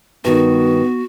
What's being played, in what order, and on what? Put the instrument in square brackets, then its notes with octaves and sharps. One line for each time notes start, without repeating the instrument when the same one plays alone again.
[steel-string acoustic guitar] G2 D#3 [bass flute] B3 [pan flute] F#4